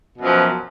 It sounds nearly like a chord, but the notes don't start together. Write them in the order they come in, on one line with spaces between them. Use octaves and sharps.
B2 F#2 F3